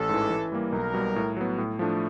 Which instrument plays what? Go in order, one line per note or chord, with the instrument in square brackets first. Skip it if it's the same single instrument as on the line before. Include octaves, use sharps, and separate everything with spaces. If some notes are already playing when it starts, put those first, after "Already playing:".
Already playing: [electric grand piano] A1 [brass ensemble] A4
[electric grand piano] G#2 E3
E3
G3 A#3
[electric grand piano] B1 [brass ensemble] A#4
[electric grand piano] B2 G3
A2
F#3 B3
A2
F3 A3 D4